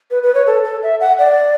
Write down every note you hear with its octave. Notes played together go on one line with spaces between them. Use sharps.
B4
B4
C#5
A4
A4
E5
F#5
D5